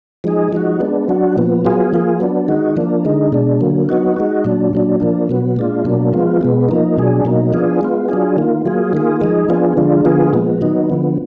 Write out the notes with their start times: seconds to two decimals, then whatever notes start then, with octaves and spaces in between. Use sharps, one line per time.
0.24 F3 G#3 D#4 G#4
0.53 F3 G#3 D#4 F#4
0.80 G#3 B3 D4
1.08 F#3 D4 F#4
1.37 A#2 F3 B3
1.65 F#3 B3 F4 G#4
1.93 F3 A#3 F4 G#4
2.20 F#3 B3 D4
2.48 D#3 G#3 D#4 F#4
2.77 F3 A#3 D4
3.05 D3 G#3 D#4
3.32 B2 G#3 D4
3.61 D3 F#3 A#3
3.89 F#3 B3 D#4 F#4
4.16 G#3 D#4 F#4
4.45 A#2 F#3 D4
4.73 A#2 F#3 D4
5.00 F3 A#3 D4
5.29 B2 F#3 B3
5.56 A#2 G#3 D4 F4
5.84 B2 F#3 A#3 D4
6.13 F3 G#3 B3 F4
6.41 B2 G#3 B3
6.69 F3 A#3 D#4
6.98 B2 F#3 D4 G#4
7.25 B2 F#3 A#3 D#4
7.53 F3 B3 D4 F4 G#4
7.81 G#3 B3 F4
8.09 F#3 D4 F4 G#4
8.37 D#3 A#3 F4
8.66 F#3 A#3 F4 G#4
8.93 D#3 A#3 F4 G#4
9.21 F3 G#3 D#4 G#4
9.49 F3 B3 D4 F4 G#4
9.77 D3 F3 G#3 D4 F4
10.05 D3 F3 B3 F4 G#4
10.33 A#2 F3 G#3 B3
10.61 D#3 F#3 B3 D#4
10.90 D3 F3 B3